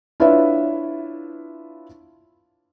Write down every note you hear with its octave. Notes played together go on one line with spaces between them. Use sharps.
D4 E4 F4 B4 C#5 E5